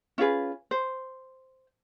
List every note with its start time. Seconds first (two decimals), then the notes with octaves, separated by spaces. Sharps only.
0.18 C#4 F4 G#4 B4
0.71 C5